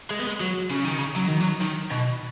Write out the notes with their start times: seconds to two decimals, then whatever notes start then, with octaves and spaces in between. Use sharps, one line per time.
0.11 G#3
0.19 B3
0.27 G#3
0.40 F#3
0.71 C#3
0.85 D#3
0.99 C#3
1.16 F#3
1.28 D#3
1.40 F#3
1.61 D#3
1.91 B2